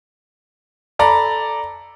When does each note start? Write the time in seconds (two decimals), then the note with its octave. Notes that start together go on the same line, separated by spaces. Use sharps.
0.99 A4 D5 A#5 B5